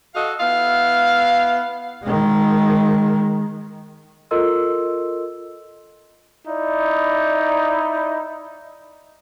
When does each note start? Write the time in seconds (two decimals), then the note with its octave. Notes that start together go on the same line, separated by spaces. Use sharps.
0.15 F#4 A4 D#5 F5
0.40 B3 E4 F5
2.04 D#3 G#3
4.31 F4 A4 A#4 D#5 C6 E6
6.48 D#4 E4 D5